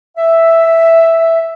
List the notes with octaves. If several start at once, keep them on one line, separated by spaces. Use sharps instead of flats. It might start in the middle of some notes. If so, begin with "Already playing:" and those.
E5